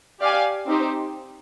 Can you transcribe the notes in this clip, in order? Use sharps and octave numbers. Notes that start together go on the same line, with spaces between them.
G4 D5 F5 G#5
C4 D#4 G4 C5